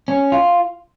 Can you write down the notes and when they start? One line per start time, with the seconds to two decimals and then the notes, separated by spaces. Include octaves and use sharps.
0.08 C#4
0.32 F4